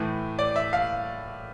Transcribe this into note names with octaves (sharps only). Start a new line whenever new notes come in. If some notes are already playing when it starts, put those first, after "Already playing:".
Already playing: A2 E3 A3
D5
E5
F5